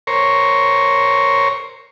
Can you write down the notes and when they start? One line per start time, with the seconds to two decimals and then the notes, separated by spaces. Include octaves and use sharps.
0.07 A#4 C5 C#5